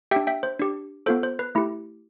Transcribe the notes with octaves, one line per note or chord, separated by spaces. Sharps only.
D4 G4 E5 G5
E5 G5
C5
D4 G4
B3 F4 A4 C5
C5
B4
A3 E4 G4